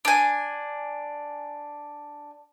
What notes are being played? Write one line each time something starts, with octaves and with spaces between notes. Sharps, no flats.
D4 G#5